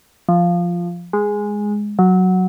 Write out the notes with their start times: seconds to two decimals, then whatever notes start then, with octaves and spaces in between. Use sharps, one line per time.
0.29 F3
1.13 G#3
1.99 F#3